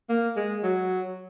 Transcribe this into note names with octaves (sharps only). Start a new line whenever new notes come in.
A#3
G#3
F#3